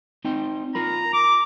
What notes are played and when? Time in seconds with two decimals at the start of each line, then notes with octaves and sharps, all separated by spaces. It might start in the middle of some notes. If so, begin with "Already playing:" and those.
0.25 C4 D#4 G5
0.75 F4 A#4 A#5 B5
1.13 A#5 D6